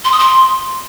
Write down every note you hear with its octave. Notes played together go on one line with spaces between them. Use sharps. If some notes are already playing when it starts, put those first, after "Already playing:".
C6
D#6
C6